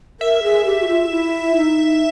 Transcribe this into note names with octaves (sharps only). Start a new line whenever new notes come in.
A#4 E5
G#4
G4
F#4
F4
E4
D#4